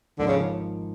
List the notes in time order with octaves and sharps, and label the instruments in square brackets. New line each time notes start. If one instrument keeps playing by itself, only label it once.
[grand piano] G#1 G#2 F3 A#3 [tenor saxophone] D3
[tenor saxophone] C#3